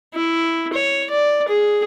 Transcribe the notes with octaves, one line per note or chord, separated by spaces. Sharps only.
E4
C#5
D5
G#4